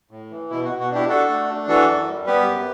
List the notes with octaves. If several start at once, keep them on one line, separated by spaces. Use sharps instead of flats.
A2
E3
B2 E4
F#4
B2
F#4
D4 E4 G4
D4 F#4 A4
A3
D4
E3 F#4 A4
F#2
G3
B3 G4 B4
F#2